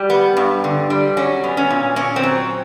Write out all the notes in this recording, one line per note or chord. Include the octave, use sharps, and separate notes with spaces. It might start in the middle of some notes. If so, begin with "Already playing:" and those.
Already playing: G3 G4
B3
G2
D3
G3
F#3 C#4
B3
C#4
A#2
A#2 C#4
C4
F#3